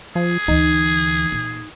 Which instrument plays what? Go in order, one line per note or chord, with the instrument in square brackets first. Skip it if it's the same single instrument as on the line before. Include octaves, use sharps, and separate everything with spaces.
[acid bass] F3 [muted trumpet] G#4
[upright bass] D2 E3 [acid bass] D#4
[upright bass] A#2